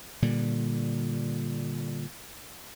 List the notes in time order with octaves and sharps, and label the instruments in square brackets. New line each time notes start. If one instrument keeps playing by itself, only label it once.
[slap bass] A#2 D3 G3